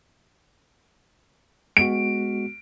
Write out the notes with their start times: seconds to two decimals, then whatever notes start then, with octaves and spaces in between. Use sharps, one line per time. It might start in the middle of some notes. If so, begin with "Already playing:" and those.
1.77 G#3 B3 F#4 D7